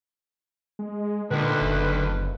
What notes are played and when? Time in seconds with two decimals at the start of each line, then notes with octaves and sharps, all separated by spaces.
0.79 G#3
1.31 D2 A#2 D3 D#3 B4
1.61 F#1